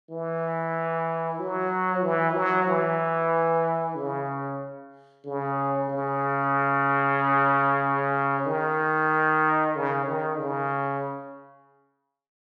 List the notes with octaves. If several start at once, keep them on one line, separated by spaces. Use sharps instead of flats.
E3
F#3
E3
F#3
E3
C#3
C#3
C#3
D#3
C#3
D#3
C#3